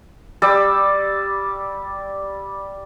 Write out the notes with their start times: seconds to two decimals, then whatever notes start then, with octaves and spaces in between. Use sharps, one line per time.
0.42 G3 D5 E6